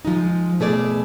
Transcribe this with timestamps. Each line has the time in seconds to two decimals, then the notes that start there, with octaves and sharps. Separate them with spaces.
0.05 F3 G#3 D#4
0.60 B2 A3 G#4 D5